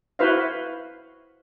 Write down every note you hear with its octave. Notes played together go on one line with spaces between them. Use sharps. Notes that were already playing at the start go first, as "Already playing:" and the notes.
E4 F#4 B4 C5 E5 F5